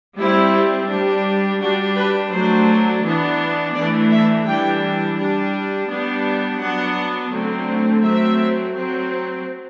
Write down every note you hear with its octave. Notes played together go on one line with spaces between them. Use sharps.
G3 C4 E4
G3 D4
G3 D4 F#4
B4
F#3 A3 D4 C5
E3 B3 D4
E3 A3 D4 D5
E5
E3 G3 D4 G5
G3 D4
G3 B3 D4
F#3 B3 D4 F#5
D3 F#3 A3 C4
F#3 A3 C4 E5
F#3 C4